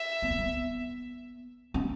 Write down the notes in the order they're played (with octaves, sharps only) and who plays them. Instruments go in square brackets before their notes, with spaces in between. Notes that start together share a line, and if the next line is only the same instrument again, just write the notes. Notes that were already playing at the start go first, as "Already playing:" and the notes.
Already playing: [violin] E5
[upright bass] B3
C#4
B3
C#4